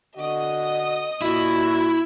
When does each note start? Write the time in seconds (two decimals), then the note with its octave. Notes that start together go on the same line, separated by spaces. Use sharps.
0.16 D3 F#4 D#5 D#6
1.22 A#2 E4 F#4